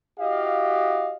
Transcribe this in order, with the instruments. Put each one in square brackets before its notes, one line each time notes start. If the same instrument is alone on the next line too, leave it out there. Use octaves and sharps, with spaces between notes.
[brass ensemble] E4 F#4 G4 D#5 F5